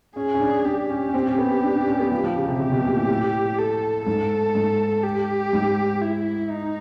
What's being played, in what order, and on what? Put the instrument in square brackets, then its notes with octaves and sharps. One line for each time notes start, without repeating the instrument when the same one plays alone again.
[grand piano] C#4 [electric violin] G#4
[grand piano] C#4
D4
[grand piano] D4 [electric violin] G4
[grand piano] C#4
C#4
C4
C#4
B3
D4
D4
C#4
B3
F3
F3
C#3
C3
[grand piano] C3 [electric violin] G4
[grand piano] B2
A#2
A2
A2
[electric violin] A4
[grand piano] G#2 [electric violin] A4
[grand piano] G#2
[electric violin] G4
[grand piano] G#2
[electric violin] E4
D#4